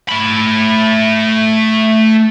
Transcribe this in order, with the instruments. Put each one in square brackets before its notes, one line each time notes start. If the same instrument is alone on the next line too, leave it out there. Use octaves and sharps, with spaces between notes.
[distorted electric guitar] A3 B5